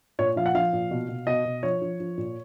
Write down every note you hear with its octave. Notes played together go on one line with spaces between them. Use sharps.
A#2 C#5
F3 F5
F#5
F3 F5
A#2
B2
B2
B2 D#5
B2
F3 C#5
F3
F3
A#2